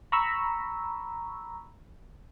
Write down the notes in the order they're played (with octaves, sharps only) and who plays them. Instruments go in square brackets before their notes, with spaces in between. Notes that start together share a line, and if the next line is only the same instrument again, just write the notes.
[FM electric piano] A#5 B5 C#6 E6